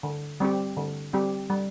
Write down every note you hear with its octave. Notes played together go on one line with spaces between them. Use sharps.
D3
G3 C4 G4
D3
G3 C4 G4
G3